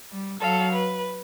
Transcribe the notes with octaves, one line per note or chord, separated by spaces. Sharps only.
G3
F#3 A4 F5
B4